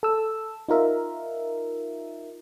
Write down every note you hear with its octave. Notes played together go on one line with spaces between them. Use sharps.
A4 E6
D#4 F4 A#4 E5